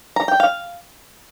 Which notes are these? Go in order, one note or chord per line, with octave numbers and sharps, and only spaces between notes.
A#5
G5
F5